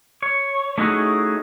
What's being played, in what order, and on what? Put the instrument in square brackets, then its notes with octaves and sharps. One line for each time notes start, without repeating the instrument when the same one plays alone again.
[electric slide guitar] C#5
A3 C#4 D#4 E4 F#4 G#4